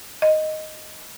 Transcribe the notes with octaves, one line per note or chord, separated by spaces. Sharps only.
D#5